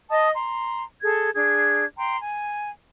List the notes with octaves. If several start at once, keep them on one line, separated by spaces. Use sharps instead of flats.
D#5 A5 D#6
A#5 C6
G#4 A4 G#6
D4 G#4 G#6
G5 A#5 C6
G#5